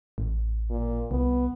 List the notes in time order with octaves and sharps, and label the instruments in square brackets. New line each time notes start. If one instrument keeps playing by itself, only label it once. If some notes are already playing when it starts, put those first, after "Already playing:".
[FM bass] A1
[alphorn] A#2
[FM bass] C2 [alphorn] B3